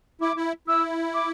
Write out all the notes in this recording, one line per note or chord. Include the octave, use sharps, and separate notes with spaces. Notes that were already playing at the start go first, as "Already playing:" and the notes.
E4 D6
E4
E4 E6
D6